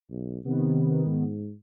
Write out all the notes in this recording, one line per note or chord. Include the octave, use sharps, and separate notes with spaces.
B1
C3 D#3 B3
G#2